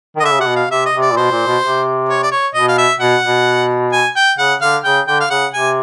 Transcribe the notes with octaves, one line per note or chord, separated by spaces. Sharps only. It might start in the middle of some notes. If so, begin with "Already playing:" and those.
D#3
D#5
D3 E5
C#3
C3 F#5
B2
F5
C3 E5
D#5
C3
D5
A#2
B2 C5
A#2
B2
C3
C#5
D5
C#5
B2 D#5
F5
E5
B2 F#5
B2
G#5
G5
C#3 F#5
D3 F5
C#3 G5
D3 G5
F5
C#3 F#5
C3 G#5